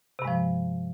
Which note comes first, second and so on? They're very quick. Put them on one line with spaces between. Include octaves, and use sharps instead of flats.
C3 G2 G#3 F3